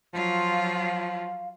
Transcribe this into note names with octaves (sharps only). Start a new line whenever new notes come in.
F3 F#3 F4 F5